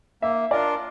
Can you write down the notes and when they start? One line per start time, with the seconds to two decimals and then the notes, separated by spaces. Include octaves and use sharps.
0.22 A#3 E5
0.51 D4 F4 A#4 D5